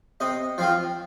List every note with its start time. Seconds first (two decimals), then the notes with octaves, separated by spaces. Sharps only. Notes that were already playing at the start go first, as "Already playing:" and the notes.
0.20 C3 D#5
0.58 F3 C4 F4